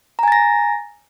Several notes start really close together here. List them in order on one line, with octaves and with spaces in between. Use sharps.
A#5 G#5 A6 A#6